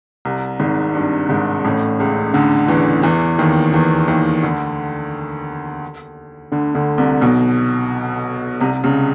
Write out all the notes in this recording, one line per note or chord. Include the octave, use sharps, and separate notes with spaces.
C2 C3
G#1 G#2
G2
G#1 G#2
A1 A2
C#2 C#3
D2 D3
E2 E3
E2 E3
D#2 D#3
E2 E3
D#2 D#3
D2 D3
D2 D3
D2 D3
C2 C3
B1 B2
C2 C3
C#2 C#3